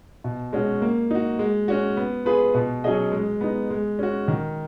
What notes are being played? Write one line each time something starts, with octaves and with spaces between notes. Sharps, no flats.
B2
G#3 C#4 F#4
A#3
D#4 F#4
G#3
C#4 F#4
B3
F4 G#4 B4
B2
F#3 C#4 G#4 D#5
G#3
B3 D#4
G#3
C#4 F#4
D#3